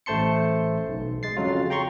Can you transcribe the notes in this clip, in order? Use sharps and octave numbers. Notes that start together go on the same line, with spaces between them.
A1 A3 C5 A5 C6 C#7
B1
G#3 A6 C7
F2 C#3 F#3 F4
G5 A#5 C6 C#6